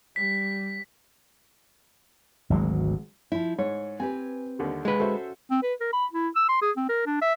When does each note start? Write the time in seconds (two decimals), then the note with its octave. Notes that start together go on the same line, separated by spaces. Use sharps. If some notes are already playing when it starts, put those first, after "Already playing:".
0.16 G3 B6
2.50 G#1 D2 F#3 G#3
3.32 F3 E4
3.59 G#2 C#5
4.00 C4 G4 B4 G#5
4.59 D#2 D3 G3
4.85 G#3 B4
5.00 C#4 F#4 A4 C5 E5
5.51 C4
5.63 B4
5.81 A#4
5.93 B5
6.13 E4
6.36 E6
6.49 C6
6.62 G#4
6.77 C4
6.89 A#4
7.07 D4
7.22 E5